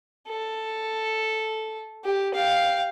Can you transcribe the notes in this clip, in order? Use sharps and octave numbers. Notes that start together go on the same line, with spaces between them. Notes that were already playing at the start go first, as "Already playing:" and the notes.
A4
G4
F5 G5